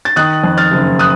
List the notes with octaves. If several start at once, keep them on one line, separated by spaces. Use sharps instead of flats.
A6
D#3 D#6 F#6
F2
F6 A6
F#1
D#6 F#6